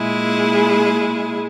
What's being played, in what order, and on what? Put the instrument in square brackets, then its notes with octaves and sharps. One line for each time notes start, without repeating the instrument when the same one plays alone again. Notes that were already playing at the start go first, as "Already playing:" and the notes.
Already playing: [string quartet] A#2 G#3 E4 G#4